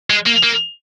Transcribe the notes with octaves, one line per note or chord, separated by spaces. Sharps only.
G#3
A#3
A#3